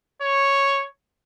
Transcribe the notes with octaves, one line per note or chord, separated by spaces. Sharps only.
C#5